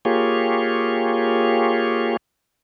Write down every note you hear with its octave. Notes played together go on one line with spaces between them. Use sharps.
A#3 F4 G4 G#4 C#5